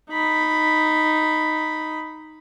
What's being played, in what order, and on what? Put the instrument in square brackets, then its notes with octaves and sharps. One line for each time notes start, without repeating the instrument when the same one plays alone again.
[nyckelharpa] D#4 B5